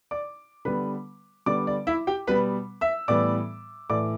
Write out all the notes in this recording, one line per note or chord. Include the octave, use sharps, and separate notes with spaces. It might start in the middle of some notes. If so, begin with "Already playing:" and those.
D5 D6
D3 G3 B3 B4 B5
D3 G3 B3 D5 D6
D5
E4 E5
G4 G5
B2 G3 B3 B4 B5
E5 E6
A2 E3 G3 B3 D5 D6
A2 E3 A3 D5 D6